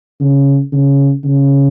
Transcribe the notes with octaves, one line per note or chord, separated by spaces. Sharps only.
C#3
C#3
C#3